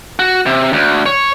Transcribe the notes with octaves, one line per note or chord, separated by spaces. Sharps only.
F#4
C3
D2
C#5